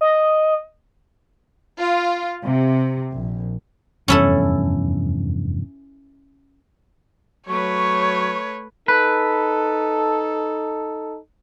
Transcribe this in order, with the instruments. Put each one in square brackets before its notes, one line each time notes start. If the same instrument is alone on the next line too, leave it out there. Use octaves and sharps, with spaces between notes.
[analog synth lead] D#5
[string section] F4
C3
A#1
[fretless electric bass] F1 E2 G2 [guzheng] C#4 E4 A4
[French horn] F#3 [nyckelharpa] A3 B4 [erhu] C#5 [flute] C#6
[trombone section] D#4 A4 [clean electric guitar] B4